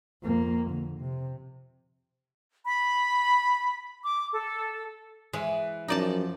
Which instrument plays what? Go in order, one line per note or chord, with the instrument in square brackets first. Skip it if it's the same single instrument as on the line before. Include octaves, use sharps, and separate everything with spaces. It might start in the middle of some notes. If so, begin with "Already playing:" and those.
[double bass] F2 A#3
D3
C3
[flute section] B5
D6
A4
[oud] E3 [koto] G#3
[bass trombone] F#2 [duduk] F3 [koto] D#4 D5 A5